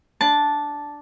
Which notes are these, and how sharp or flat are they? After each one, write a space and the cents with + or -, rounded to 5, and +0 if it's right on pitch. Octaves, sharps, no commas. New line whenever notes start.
D4 +0 A5 -5